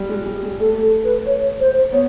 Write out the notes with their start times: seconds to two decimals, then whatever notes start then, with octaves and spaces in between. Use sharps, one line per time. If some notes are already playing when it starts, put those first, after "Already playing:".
Already playing: G3
0.09 G#3
0.26 G3
0.43 G#3
0.59 A3 A4
0.82 A4
1.04 B4
1.26 C#5
1.60 C5
1.92 B3 C#5